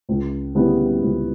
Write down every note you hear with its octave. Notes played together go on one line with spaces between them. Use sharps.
C#2
C#3 G3 B3 E4
C#2